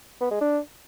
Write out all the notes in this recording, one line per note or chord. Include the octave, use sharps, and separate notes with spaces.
B3
G#3
D4